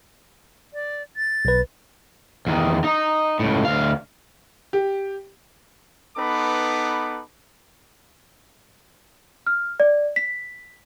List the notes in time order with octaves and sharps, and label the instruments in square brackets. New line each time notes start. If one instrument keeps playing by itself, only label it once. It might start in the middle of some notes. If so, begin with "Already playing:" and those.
[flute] D5
A6
[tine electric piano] B1 B4
[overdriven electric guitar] E2 D#3
D#4
C#2 A2
D2 F5
[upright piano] G4
[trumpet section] B3 D#4 A4 B4 B5 D6
[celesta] F6
D5
B6